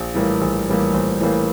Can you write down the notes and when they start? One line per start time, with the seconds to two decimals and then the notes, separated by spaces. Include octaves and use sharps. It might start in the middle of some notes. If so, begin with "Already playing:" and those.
Already playing: A#1
0.14 A2 E3 G3 A#3
0.41 A#1
0.67 A2 E3 G3 A#3
0.94 A#1
1.20 A2 E3 G3 A#3